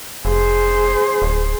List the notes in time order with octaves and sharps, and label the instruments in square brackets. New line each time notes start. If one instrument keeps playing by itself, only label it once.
[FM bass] F1 [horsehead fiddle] G#4 C5
[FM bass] D1